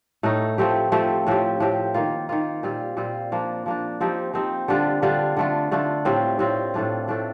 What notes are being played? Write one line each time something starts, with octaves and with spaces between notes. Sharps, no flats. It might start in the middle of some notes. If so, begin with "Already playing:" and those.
A2 A3 D#4
F3 A3 C4 G4
F3 A3 C4 G4
A2 F3 C4 G4
A2 F3 C4 G4
D#3 A#3 F4
D#3 A#3 F4
A#2 G3 C4 F4
A#2 G3 C4 F4
F3 A#3 D4
F3 A#3 D4
F3 C4 D#4 G4
F3 C4 D#4 G4
D3 G3 D4 F4
D3 G3 D4 F4
D3 A3 D4 F4
D3 A3 D4 F4
A2 G3 C4 F4
A2 G3 C4 F4
A2 A3 D4 F4
A2 A3 D4 F4